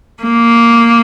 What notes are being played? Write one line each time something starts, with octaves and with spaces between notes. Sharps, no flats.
A#3